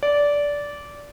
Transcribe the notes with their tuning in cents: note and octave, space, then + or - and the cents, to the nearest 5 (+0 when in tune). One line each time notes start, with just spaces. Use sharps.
D5 -15